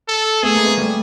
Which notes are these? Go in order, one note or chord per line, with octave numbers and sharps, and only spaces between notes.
A4
A3 B3 G#4
G#3 A#3
A3 B3
G3 A3